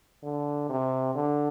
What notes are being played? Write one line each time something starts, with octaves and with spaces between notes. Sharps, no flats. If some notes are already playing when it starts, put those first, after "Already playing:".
D3
C3
D3